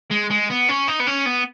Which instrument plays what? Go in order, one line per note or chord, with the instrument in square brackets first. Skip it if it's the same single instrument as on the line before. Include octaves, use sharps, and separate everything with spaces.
[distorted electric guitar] G#3
G#3
B3
C#4
D#4
B3
C#4
B3